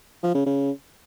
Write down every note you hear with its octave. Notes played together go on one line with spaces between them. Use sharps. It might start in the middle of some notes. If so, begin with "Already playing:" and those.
F3
C#3
C#3